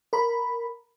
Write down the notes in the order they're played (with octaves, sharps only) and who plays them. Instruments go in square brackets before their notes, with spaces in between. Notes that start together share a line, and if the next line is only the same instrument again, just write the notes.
[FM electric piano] A#4 B5